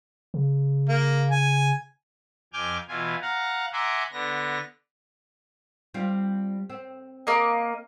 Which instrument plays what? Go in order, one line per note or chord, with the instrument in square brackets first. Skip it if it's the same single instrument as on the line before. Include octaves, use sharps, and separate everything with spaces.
[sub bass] C#3
[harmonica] A#3
G#5
[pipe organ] F2 G#5 D6 F6 G6
B2 E3 F4 G#5
F5 F#5 A#5
E5 F#5 G#5 A#5 C6 D6
D3 B3 A#6
[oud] G3 C4 F4
C4
[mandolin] A#3 D#5